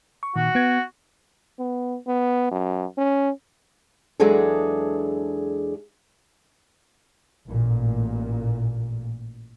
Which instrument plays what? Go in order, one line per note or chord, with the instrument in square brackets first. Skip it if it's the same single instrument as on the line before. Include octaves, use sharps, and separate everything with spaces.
[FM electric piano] C#6
[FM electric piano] A#2 D#3 [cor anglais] F#4
[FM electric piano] B3 G#6
[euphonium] B3
B3
F#2
C#4
[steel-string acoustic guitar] E2 F#3 G#3 D4 G#4 A4
[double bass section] A1 A#2